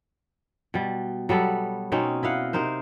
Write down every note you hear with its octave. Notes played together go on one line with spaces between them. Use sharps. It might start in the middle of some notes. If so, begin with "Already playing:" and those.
B2 G3
F#3 G3 B3 A4
B2 C4 C#4 D#4
E4 D#5 F5 F#5
C3 D#4 A#4 C5